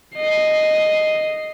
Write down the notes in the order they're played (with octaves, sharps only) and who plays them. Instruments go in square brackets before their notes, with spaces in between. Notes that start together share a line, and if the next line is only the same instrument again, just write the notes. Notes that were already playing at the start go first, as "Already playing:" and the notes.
[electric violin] D#5 C7